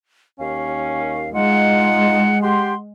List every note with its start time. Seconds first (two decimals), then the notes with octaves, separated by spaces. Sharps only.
0.39 D#2 C#4 F5
1.34 G#3 D#4 F4 F#5
2.42 G4 F#5 C6